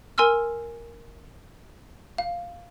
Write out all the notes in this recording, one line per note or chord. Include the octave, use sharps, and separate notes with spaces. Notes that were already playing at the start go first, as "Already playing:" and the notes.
A#4 G#5 C6 E6 F6
F5